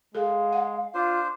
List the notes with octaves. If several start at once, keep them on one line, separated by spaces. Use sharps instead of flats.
G#3 G#4 A4 F5
F#5
D4 F4 C5